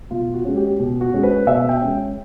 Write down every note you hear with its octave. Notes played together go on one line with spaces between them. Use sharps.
B2 F4
F#4
G#3 C#4
G4
B2
F#4
G#3 C#4
B4
B2 E5
G5
G#3 C#4